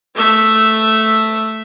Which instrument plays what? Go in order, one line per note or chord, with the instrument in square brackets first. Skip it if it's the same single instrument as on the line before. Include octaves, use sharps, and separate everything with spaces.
[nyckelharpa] A3 E5